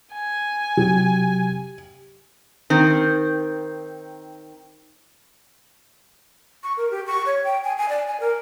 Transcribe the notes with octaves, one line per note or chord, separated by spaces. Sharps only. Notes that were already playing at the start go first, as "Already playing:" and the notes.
G#5
C3 F#3 G4
D#3 C4
C#6
A#4
G4
C#6
C#5
G5
G#5
G#5
D5
G#5
A#4